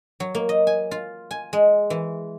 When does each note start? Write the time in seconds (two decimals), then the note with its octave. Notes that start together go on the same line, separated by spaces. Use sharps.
0.20 F#3
0.35 A#3
0.49 D#5
0.67 G#5
0.91 F4
1.31 G#5
1.53 G#3
1.90 E3